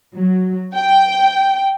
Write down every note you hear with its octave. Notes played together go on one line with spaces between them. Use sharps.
F#3
G5